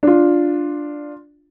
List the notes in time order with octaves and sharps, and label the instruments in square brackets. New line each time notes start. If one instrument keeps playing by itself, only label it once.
[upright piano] D4 F4